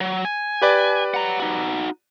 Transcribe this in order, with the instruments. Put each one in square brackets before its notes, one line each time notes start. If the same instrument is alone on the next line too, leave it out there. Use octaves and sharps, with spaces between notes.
[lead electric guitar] F#3
G#5
[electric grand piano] G4 B4 D5
[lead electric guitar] F#5 A#5
D#4 F#4